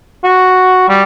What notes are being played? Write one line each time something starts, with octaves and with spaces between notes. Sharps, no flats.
F#4
G3